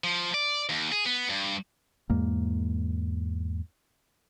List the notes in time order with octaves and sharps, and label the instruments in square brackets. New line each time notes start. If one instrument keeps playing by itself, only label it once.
[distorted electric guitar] F3
D5
D#2
G#4
B3
G2
[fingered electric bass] E2 G#2 G#3 A#3